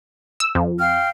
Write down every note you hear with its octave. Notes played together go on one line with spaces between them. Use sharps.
E6
F2
F5 G5 F6